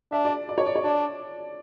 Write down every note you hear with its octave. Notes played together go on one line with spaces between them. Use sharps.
D4 E5
D5
D5
C#5
D5
C#5
D4 D5